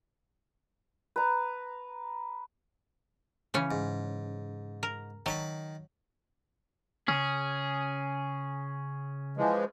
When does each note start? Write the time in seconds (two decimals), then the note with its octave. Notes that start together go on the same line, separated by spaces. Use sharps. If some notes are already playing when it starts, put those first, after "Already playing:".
1.16 B4 A#5
3.54 C#3 E3 C#4
3.71 G#2
4.83 A#4
5.26 D#3 F#3 A5 B5
7.08 C#3 C#4 G#4
9.37 E3 F3 G#3